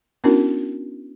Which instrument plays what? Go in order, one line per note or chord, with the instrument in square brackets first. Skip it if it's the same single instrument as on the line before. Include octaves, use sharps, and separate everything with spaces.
[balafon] B3 C#4 D4 E4 F#4 A#4